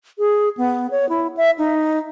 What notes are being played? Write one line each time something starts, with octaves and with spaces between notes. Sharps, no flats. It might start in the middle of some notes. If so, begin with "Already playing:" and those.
G#4
B3
C#5
E4
E5
D#4